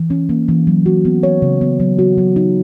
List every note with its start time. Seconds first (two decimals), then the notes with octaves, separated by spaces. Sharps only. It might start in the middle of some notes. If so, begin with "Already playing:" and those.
Already playing: E3
0.10 C#4
0.29 A#3
0.48 E3
0.67 F#3
0.86 F#4
1.05 B3
1.23 C#5
1.42 C#3
1.61 B3
1.80 F#3
1.99 F#4
2.18 F#3
2.36 D#4